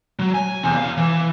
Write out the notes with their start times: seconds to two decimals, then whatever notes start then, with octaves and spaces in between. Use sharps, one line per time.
0.19 F#3
0.34 G#5
0.63 E2 C3
0.77 E2 F5
0.97 E3